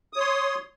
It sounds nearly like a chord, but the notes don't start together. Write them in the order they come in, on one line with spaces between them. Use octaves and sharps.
D#6 C#5 C6